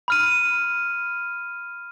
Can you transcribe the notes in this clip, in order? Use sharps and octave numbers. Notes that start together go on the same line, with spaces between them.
B5 F6 D#7